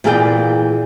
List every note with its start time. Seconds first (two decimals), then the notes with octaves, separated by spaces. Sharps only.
0.04 A#2 E3 G#4 A4 D5 G5